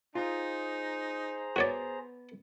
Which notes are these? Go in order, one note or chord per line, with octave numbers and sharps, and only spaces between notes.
D#4 F4 G#4 C5 A#5
B3 F#4 C#5 D5